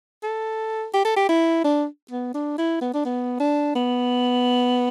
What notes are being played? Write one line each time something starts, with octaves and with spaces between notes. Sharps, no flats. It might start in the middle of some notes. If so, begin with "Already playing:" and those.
A4
G4
A4
G4
E4
D4
B3
D4
E4
B3
D4
B3
D4
B3